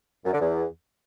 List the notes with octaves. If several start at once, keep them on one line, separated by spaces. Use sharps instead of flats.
F#2
D3
E2